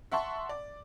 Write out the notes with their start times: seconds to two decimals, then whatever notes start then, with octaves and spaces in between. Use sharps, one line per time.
0.12 E5 F#5 A5 C6 C#6
0.49 D5